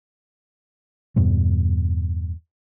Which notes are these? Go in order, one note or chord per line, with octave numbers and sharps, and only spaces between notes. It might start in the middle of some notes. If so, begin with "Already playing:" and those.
E2 G2 B2 G3